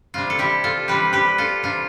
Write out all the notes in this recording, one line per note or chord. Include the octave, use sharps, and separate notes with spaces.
C3 G3 D4 F4
A4
E4 G4
F4 A4
C3 G3 D4 G4 B4
G4 B4
F4 A4
C3 G3 D4 F4